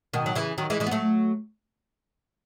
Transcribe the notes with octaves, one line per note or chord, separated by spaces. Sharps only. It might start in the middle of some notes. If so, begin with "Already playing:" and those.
B2 D#3
F#3
C#3 E3
D#3 F#3
E3 G#3
E3 G#3
B3
F#3 A3